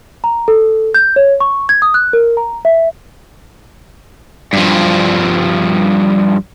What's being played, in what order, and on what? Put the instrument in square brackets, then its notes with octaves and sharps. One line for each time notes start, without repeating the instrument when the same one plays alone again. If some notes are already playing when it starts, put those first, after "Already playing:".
[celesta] A#5
A4
G6
C#5
C#6
G#6
D#6
F#6
A#4
A#5
E5
[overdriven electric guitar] G2 F3